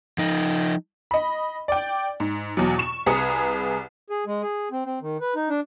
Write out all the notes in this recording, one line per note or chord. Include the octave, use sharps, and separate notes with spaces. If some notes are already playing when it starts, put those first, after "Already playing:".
F3 D#4
D#5 B5
D5 G5
G#2
E2 B2 F#3
C#6 E7
C2 G#4 B4 A#5 D#6 C#7
G#4
G#3
G#4
C4
C4
D#3
B4
D#4
D4